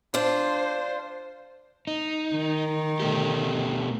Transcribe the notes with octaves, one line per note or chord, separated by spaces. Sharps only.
D4 F4 C5
D#4
D#3
B2 A3 G4